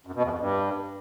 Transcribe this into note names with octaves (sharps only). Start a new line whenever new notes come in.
F#2
B2
E2
F2
G2